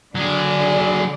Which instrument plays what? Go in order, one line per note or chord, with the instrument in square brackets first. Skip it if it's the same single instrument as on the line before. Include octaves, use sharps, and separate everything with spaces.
[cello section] D3 D5 [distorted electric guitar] F#3 G#4